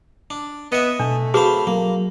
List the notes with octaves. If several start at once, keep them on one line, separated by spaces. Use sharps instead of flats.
D4
B3 D#5 E5
B2 A3 D4
C4 F#4 G#4 B4 C5 F5 A5 B5
F#3 A#3